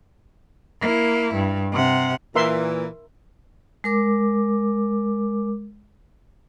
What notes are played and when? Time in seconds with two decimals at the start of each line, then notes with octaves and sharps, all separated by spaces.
0.81 A#3 E4
1.35 G2
1.73 C3 F#5
2.36 A#2 E3 A#4 E5 C6
3.84 G#3 A#4 D6